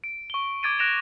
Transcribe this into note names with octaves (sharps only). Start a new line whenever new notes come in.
D7
C#6 G7
D6 G#6 A6 D7 D#7
F#6 G#6 A#6 D7 E7 F7